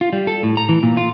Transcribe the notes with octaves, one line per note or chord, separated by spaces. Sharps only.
F4
G3
A4
A2
A#5
E3
A#2
F4